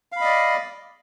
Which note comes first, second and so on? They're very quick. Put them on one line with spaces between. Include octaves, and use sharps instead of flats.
F5 B5 D#5 D5